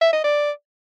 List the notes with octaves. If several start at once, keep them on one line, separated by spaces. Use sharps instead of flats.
E5
D#5
D5